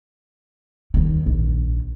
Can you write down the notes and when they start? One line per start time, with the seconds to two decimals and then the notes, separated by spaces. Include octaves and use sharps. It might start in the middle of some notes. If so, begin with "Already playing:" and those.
0.94 D#2 D#3
1.26 A#1